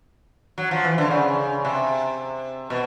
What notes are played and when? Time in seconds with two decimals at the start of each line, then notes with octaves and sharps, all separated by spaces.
0.58 F#3
0.71 F3
0.85 E3
0.98 D3
1.11 C#3
1.65 C3
2.70 B2